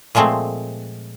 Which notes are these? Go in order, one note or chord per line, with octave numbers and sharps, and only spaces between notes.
A#2 F3 G#3 A3 C4